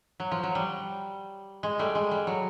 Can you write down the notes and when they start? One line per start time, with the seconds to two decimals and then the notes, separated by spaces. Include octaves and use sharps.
0.20 F#3
0.31 F3
0.43 F#3
0.55 G3
1.63 G#3
1.79 G3 A3
1.95 G#3
2.11 G3
2.27 F#3